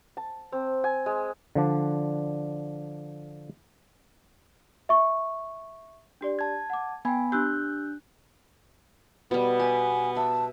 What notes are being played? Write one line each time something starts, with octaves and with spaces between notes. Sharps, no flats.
A5
C4
G#5
G#3
D3 F3 D4
E5 C#6
D4 G4 D5
A5 G#6
F#5 D6
B3 G5 G#5 B5 G#6
D4 G4 E6 F#6 G6
B2 G3 B3
G4 G#5
E5 A5